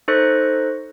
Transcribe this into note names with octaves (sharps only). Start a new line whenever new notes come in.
D#4 A4 C5 C#6 F#6 A#6